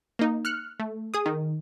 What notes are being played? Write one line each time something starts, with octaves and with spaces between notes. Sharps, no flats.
A#3 D#4
F6 F#6 C#7
A3
G#4 D#6
D#3